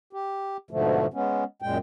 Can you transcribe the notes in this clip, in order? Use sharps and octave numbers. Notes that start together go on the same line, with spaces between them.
G4
G#2 B2 D3 F3 A3
G#3 B3 C#4
F#2 A#2 G#3 G5